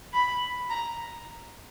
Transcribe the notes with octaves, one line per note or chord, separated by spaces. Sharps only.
B5
A#5